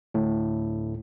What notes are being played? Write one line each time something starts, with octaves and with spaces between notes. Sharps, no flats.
D2 A2